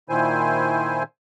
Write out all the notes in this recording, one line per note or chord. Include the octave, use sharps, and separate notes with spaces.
A#2 D#3 E4 C5 G#5